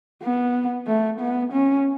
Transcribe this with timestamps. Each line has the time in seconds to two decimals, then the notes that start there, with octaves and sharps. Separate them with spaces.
0.22 B3
0.87 A3
1.20 B3
1.52 C#4